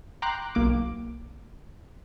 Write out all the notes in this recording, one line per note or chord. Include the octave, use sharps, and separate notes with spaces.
G5 A#5 C6 D6 F#6
B1 A#3 D6